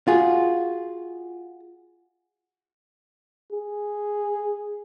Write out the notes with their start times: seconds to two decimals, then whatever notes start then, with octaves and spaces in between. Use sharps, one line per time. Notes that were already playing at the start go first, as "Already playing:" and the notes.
0.08 F4 F#4 G#4
3.53 G#4